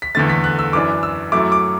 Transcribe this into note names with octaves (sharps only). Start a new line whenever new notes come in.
B6
E2 D3 A3 A6
B6
F#6
E6
F#2 E3 D4 D6
E6
F#2 F#3 A3 E4 D6
D6